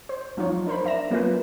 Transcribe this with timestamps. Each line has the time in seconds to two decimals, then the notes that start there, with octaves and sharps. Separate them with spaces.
0.09 C5
0.37 F3 F#3 D#4 F4 C#5
0.66 D4 A#4 C5 B5
0.84 D4 E5 A#6 E7
1.11 F#3 A#3 B3 C#4 F4 B4